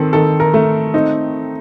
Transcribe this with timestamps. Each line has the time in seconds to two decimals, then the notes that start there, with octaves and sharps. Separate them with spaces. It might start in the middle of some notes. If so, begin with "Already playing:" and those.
Already playing: D#3 C4 A4
0.13 D#3 A4
0.40 A#4
0.54 A3
0.94 C4 D#4